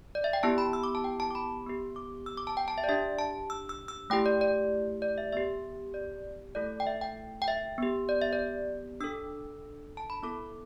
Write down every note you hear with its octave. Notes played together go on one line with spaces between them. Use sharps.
D5
E5
G5
B3 E4 G4 A5
B5
E6
D6
A5
G5
A5
D6
B5
B3 G4
D6
E6
D6
A5
G5
A5
E5
D5
D4 G4 E5
A5
E6
E6
E6
A3 E4 G4 G5
D5
D5
D5
E5
B3 G4 E5
D5
A3 E4 A4 D5
G5
E5
G5
G5
E5
B3 G4
D5
E5
D5
D4 A4 E6
A5
B5
B3 E4 A4 D6